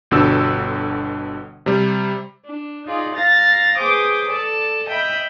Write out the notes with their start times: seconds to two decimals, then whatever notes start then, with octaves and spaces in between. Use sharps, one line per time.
0.11 G1 B2 D3 E6
1.66 C3 G3
2.46 D4
2.86 D#4 F4 G#4 D5
3.15 F5 A#5 A6 A#6
3.77 G#4 B4 C5 G5 D6 D#6
4.27 A4 D5 A5
4.86 D#5 E5 G5 B5